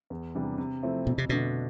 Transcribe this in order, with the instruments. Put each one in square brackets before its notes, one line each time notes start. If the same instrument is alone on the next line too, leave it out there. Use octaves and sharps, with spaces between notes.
[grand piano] E2
C3 E3 G3 D4
C3
F3 A3 C4 E4
[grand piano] F2 [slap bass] B2
[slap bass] C3
[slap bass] B2 [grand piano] D3 A3 D4